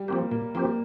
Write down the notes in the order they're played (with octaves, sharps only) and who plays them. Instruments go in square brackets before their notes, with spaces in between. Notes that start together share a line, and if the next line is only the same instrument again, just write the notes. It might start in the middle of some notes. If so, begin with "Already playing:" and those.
Already playing: [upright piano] G3
[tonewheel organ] F3 C4 G4 [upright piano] A#3
[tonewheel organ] A#2 [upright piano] A#3
[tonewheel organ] F3 C4 G4 [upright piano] A#3